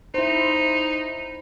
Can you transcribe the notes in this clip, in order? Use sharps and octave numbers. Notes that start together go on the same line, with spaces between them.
D#4 E4 C5